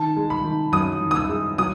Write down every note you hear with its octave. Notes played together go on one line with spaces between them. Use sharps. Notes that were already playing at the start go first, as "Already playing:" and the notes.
Already playing: D#3 A5
G#3
B5
D#3
F#2 D#6
D#3
D#6
E6
G#3
F#3 D#6